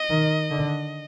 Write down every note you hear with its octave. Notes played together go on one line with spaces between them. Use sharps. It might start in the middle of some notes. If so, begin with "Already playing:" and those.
Already playing: D#5
D#3
D3